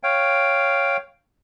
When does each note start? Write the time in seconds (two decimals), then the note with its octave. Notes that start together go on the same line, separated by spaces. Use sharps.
0.03 C#5 F5 G5